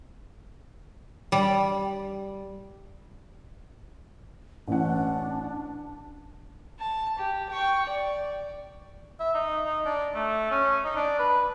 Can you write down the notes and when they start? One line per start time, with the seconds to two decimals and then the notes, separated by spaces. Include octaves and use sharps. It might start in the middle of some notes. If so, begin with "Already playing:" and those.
1.32 G3
4.68 A1 C#4 D4 F#5
6.79 A5
7.18 G4
7.50 G5 C#6
7.86 D5
9.20 E5
9.34 D#4
9.65 D#4
9.85 D4
10.15 A3
10.51 C#4
10.84 D#4
10.96 D4
11.19 B4